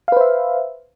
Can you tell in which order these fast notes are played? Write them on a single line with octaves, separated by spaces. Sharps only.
F5 B4 C5 E5